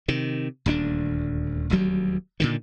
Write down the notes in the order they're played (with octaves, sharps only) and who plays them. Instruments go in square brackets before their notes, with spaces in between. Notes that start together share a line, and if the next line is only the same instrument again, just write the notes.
[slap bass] C3 D#3
D#1 D2 A#3 D4
D#1 D2 F#3 G3
A#2 D3 D#3